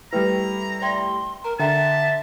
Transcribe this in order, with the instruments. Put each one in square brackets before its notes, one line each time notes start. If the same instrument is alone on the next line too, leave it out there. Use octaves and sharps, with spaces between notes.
[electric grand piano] G3 A3 E4 [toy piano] B4 G5 [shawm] A#5
[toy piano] D5 E5 G5 [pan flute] C6
[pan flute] A#4 [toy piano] A#5
[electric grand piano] D3 [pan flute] E5 [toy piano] F5 G5 A#5 [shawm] A5